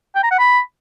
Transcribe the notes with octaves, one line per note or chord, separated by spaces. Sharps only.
G5
A#5
F#5
B5